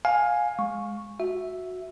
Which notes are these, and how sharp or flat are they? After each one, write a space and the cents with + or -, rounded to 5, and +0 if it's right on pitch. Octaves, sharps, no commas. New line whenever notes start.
F5 +20 G#5 +0
G#3 +0 C#6 -5
F#4 -10 E5 +0